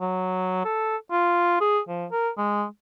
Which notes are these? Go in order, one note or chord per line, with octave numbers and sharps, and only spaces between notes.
F#3
A4
F4
G#4
F3
A#4
G#3